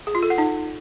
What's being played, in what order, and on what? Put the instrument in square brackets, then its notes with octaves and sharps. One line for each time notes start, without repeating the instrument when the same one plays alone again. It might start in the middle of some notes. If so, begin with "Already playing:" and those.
[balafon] G#4
F4
A4
F#5
D#4